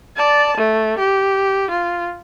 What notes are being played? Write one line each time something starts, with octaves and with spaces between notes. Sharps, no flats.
D5 A5
A3
G4
F4